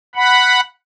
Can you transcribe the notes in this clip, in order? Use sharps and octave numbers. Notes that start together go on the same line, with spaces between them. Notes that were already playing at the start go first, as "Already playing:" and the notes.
F#5 B5